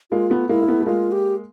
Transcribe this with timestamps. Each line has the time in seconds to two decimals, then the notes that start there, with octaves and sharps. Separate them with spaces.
0.11 G#3 A#3 F4
0.30 A3 B3
0.49 G#3 A#3 E4
0.62 A#3
0.68 A3 B3
0.80 A3
0.86 G#3 A#3 F4
1.12 G4